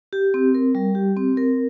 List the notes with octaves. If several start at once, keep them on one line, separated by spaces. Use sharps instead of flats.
G4
C4
A#4
G3
G4
C4
A#4